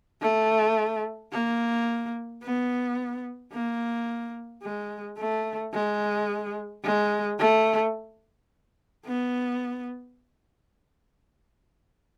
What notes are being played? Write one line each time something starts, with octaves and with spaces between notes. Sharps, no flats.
A3
A#3
B3
A#3
G#3
A3
G#3
G#3
A3
B3